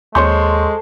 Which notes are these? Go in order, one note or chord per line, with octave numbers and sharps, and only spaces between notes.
D#2 G#3 A4 C5 C#5 C6 C#6 G6